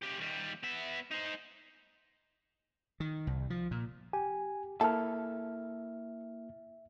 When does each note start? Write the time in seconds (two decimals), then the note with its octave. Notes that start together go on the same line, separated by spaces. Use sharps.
0.02 C#3 G4
0.20 D#2 G3
0.64 B3 E5
1.11 D#4 C5
3.00 D#3
3.27 C2
3.50 F3
3.71 A#2
4.13 G4 G#5
4.81 A#3 E4 A4 E5 A5 F6